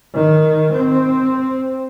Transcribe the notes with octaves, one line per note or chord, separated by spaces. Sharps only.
D#3
C4